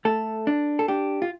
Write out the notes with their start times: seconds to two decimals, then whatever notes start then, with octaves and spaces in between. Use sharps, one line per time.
0.05 A3 A4
0.47 D4
0.79 A4
0.88 D4 G4
1.22 F4